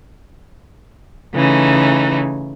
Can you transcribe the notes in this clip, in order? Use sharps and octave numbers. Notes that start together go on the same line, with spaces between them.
C#3 E3 A3 D#4